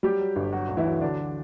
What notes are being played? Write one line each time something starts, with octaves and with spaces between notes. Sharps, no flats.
F#3 G3 G4
F#3
G1
F#3 F#4
D2
E3 E4
F#3
D3 F#3 D4
F#3